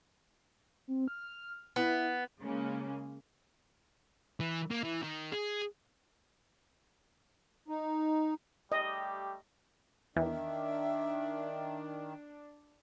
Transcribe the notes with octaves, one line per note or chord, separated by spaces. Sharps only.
C4
F6
B3 E4
C#3 G#3 A#3 C#4
E3
A#3
E3
D#3
G#4
D#4
G3 A3 G4 D#5
E2 D#3 D4 E5